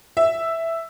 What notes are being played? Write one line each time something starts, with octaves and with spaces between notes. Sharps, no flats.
E5